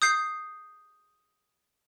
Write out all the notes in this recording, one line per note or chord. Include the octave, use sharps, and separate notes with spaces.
D#6 G6 C7